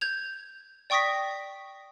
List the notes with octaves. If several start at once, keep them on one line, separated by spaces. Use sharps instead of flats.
G6 G#6 F7
D5 G5 C#6 D#6 A#6 B6